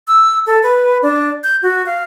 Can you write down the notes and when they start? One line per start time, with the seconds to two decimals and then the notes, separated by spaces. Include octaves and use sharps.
0.08 E6
0.47 A4
0.63 B4
1.02 D4
1.44 G6
1.63 F#4
1.86 F5